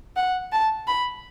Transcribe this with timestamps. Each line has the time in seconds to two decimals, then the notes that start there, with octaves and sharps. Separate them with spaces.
0.16 F#5
0.52 A5
0.87 B5